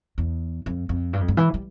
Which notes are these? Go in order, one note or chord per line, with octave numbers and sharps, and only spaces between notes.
E2
F2
F2
G2
F2
G2
E3
G3